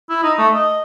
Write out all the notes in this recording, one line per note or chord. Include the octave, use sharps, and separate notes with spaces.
E4
D#4
A3
D#5